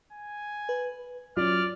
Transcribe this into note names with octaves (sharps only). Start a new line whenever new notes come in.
G#5
B4
F#3 C#4 F4 D5 F6